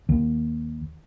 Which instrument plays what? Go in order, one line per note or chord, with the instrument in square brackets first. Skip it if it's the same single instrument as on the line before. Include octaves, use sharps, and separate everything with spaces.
[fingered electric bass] D#2